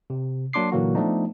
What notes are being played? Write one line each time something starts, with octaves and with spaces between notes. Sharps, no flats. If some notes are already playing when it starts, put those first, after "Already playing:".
C3
F#3 A#3 D4 C6 D6 C7
A#2 D3 E3 F#3 A#3 F#4
F3 A3 B3 D4 D#4